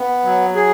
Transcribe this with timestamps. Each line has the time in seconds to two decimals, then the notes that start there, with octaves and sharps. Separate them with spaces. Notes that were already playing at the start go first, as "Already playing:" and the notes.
Already playing: B3
0.24 F#3
0.55 G#4